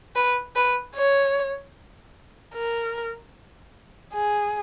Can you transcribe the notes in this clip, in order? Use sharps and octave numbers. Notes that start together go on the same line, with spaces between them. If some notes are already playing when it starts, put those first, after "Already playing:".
B4
B4
C#5
A#4
G#4